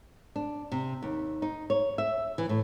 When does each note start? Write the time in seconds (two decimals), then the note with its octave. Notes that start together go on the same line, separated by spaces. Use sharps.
0.36 D4
0.72 C3
1.03 D#2
1.42 D#4
1.70 C#5
1.98 E5
2.38 E3
2.49 A2